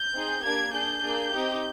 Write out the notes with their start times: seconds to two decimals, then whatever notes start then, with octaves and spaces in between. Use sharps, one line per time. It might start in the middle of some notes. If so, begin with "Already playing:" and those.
Already playing: G6
0.14 C4 D#4 G#4
0.43 A#3 D4 G4 G#6
0.72 D4 G#4 G6
1.02 A#3 D4 G#4
1.31 C4 D#4 G4